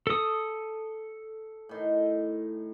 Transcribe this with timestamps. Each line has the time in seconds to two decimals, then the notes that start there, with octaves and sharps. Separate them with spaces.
0.07 A4 D#6
1.69 A2 D#3